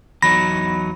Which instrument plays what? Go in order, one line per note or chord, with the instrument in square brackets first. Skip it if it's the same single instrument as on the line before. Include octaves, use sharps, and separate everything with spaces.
[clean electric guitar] E2 F#3 D#4 [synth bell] B5 [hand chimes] A#6